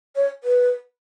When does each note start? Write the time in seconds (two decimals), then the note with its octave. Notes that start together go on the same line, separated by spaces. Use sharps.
0.16 C#5
0.43 B4